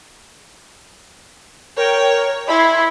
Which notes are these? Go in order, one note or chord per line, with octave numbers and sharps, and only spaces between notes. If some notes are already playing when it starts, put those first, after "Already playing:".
A#4 C#5 G5
E4 B5 C6 G#6